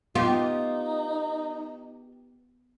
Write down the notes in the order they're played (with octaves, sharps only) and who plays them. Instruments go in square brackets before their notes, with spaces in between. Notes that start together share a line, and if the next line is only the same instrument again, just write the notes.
[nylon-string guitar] B3 [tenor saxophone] D#4 [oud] F4 [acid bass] G4